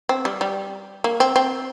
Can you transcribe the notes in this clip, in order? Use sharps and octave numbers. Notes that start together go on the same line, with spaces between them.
C4
G3
G3
A#3
C4
C4